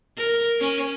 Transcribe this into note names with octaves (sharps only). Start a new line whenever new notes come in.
A#4
C#4